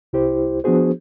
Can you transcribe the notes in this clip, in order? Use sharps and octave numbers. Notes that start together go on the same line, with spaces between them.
C2 E4 G4 C5
F3 B3 D4 F#4 G#4 C5